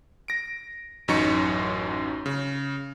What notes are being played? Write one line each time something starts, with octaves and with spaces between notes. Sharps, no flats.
A#6 D7
A1 F#2 F#3 D#4 C#6 C#7
C#3